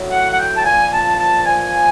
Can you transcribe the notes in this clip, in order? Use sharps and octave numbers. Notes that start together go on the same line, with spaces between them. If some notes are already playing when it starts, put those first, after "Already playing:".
Already playing: A2 F#3
F#5
F#5
G5
A5
A#2 F3 G#5
A5
A5
A#2 F3 G#5